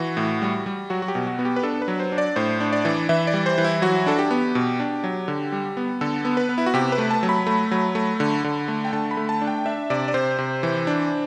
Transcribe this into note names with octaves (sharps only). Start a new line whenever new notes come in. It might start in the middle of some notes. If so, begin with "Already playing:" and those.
Already playing: E3 F#4
A2
G3
G3
F#3 F#4
F#4
G4
B2
F#4
B3
G4
B4
D4 A4
B4
F#3
C5
D4
D5
A2 C5
D4
D5
E3
E3 E5
D5
G3
C5
E3
E4
F#3 F#4
D4 A4
G4
B3
B2
D4
F#3
D3
G3
B3
D3 A4
B3
B4
B3
E4
F#4
C3 G4
B4
A3
A5
F#3
B5
A3
F#3
A3
D3
D3
A3
G5
D3 A5
B5
A3
A5
D4
G5
D4 E5
C3 D5
D5
C3 C5
C3
E3
D4